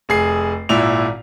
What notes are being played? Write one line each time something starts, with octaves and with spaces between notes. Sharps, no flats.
F1 G#4 C7
G#1 A#2 E4 F7